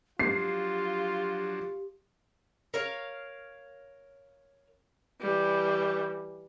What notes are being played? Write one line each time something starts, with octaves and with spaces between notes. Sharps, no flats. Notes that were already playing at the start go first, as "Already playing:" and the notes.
F3 F#3 D4 F4 G4 C7
A#4 C#5 F5
E3 G3